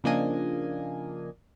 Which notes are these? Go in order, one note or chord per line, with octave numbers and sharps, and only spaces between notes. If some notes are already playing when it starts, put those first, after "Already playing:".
C#3 F3 A#3 D4 D#5 G#5